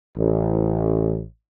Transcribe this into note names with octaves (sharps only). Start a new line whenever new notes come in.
A1